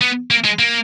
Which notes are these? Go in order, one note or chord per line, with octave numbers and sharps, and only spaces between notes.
B3
A#3
G#3
A#3